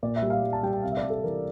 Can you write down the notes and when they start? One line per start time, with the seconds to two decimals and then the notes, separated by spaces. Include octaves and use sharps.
0.03 A#2 D5
0.16 E5
0.22 G3
0.30 F5
0.43 G3
0.53 A5
0.63 G3 G5
0.73 G5
0.83 C3 F5
0.92 E5
0.97 D5
1.03 G3
1.10 A4
1.24 E3 A#4